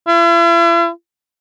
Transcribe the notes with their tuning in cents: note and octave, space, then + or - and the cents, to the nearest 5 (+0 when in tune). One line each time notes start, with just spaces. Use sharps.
E4 +45